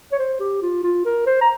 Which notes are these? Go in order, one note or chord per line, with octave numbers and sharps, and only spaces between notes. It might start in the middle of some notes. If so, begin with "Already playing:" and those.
C#5
C5
G4
F4
F4
A#4
C5
A#5